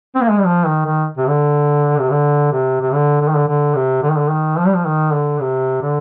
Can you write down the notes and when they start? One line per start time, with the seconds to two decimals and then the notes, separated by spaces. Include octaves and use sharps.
0.15 C4
0.22 A#3
0.30 G#3
0.38 G3
0.46 F3
0.66 D#3
0.86 D#3
1.18 C3
1.28 D3
1.99 C3
2.10 D3
2.52 C3
2.81 C3
2.93 D3
3.21 D3
3.29 D#3
3.36 D3
3.48 D3
3.75 C3
4.03 D3
4.10 D#3
4.17 D3
4.30 D#3
4.58 F3
4.66 G3
4.74 F3
4.86 D#3
5.14 D3
5.41 C3
5.82 D3